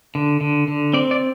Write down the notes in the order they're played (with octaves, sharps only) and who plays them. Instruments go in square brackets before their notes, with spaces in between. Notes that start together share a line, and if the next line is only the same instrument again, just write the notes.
[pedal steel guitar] D3
D3
D3
C4 D5
D5